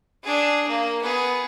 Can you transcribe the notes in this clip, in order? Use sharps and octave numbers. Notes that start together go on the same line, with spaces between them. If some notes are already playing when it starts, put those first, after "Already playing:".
D4 G#4
A#3
B3 G#4